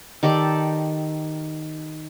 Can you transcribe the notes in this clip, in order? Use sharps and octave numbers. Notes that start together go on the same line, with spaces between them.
D#3 G4 A4 D5